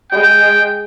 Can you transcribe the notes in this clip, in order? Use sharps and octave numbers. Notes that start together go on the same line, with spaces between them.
G#3 G5